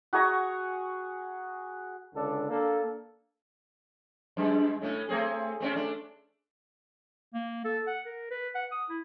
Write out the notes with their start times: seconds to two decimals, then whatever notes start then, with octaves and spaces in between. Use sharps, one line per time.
0.13 F#4 G#4 A#5 C#6
2.15 C#2 D3 D4 A4
2.49 A#3 D4 A4
4.37 F#2 G#3
4.82 A2 A3 C#4
5.09 A3 C4 G#4
5.60 A3 C4 C#4
5.76 A3 D4
7.34 A#3
7.65 A4
7.87 F#5
8.05 A#4
8.31 B4
8.55 F#5
8.71 D#6
8.90 E4